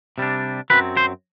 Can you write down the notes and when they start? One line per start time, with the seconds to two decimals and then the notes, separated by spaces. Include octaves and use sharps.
0.18 C3 G3 D4
0.70 F#2 F#3 C4 B4
0.97 C5